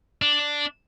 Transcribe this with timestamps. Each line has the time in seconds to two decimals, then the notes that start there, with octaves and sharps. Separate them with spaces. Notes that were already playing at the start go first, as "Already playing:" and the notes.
0.22 D4